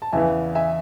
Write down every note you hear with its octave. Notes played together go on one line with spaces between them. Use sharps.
A5
E2 C#3 E3 E5 G#5
E5 G#5